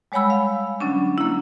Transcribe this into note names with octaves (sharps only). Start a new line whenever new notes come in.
G3 G#3 C#5 F#5 B5 E6
F5
D3 F#3 C#4 D4
A#3 E4